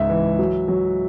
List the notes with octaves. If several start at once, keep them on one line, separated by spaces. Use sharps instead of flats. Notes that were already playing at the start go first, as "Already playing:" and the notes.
Already playing: C#2 G#2 E5
E3
F#3
F#3